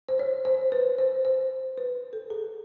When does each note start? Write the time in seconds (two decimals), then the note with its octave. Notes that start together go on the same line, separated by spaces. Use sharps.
0.09 C5
0.19 C#5
0.45 C5
0.72 B4
0.98 C5
1.25 C5
1.78 B4
2.13 A4
2.30 G#4